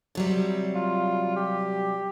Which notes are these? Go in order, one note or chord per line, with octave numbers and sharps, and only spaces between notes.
C3 F#3 G3
F4
G4